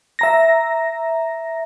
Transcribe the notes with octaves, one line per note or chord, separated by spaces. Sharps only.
E5 A#5 A#6